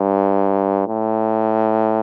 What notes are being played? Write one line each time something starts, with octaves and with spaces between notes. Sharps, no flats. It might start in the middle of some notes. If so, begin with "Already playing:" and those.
Already playing: G2
A2